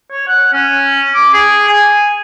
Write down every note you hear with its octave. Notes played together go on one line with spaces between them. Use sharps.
C#5
F#5
C#4
D6
G#4
G#5